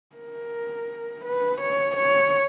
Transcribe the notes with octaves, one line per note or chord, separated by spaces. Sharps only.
A#4
B4
C#5
C#5